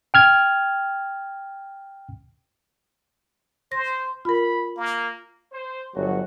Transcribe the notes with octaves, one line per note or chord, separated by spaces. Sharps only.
G5 F6 G#6
C5 A#6
F4 A#4 B5
A#3
C5
G1 F#3 F#4